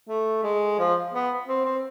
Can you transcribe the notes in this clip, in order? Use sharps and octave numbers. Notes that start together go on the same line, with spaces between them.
A3
G#3
F3
B3
C4
C4